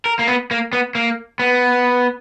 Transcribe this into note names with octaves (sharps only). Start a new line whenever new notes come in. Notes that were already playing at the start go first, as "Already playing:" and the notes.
A#4
A#3
B3
A#3
B3
A#3
B3